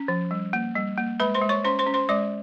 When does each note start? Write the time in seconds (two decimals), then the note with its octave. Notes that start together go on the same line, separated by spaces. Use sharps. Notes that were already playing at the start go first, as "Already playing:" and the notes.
Already playing: C#4
0.08 F3
0.31 G3
0.53 A#3
0.76 G3
0.98 A#3
1.20 G#3 B4 B5
1.34 C5 C6
1.42 G#3
1.49 C#5 C#6
1.64 C#4 C5 C6
1.79 C5 C6
1.86 C#4
1.94 C5 C6
2.09 G#3 D5 D6